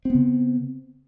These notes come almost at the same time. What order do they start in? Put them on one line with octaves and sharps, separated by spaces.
C4 B3 C#3